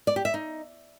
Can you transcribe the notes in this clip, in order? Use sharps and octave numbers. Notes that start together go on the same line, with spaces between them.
D5
G4
E5
D#4